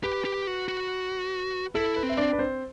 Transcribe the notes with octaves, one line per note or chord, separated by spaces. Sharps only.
G4 B4
G4
F#4
F#4
E4 A4
B4
C4
E5
D4 D5
B4
C4 C5